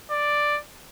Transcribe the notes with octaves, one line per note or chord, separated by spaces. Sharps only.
D5